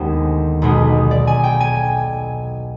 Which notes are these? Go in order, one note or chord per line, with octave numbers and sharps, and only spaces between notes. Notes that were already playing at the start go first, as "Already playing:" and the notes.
Already playing: D#2 D3 G#3 B3 C5 G#5
B1 B2 G#3 B3
D5
G#5
G5
G#5